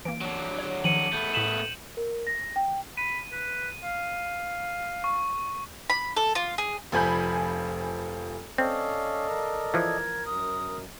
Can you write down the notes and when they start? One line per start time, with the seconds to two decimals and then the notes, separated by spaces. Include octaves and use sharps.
0.05 E3 A#3 D7
0.21 F#3 D4
0.59 C#5
0.84 D#3 F3 C#7 D#7 F#7
1.13 A3 B3 G6
1.34 A2 B6 E7 F#7
1.97 A#4
2.27 A#6
2.56 G5
2.98 B5 D#7
3.32 B4
3.84 F5
5.04 C#6
5.90 B5
6.17 A4
6.35 F4
6.58 G#4
6.92 F1 F3 G#5 B5 G6
8.58 C4 C#4 A4 D5 D#5 F5
9.29 A#4
9.74 E3 F3 G#6
10.26 F#2 D#6